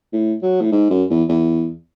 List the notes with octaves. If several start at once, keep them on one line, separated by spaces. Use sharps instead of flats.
A2
F#3
A2
G#2
F#2
E2
E2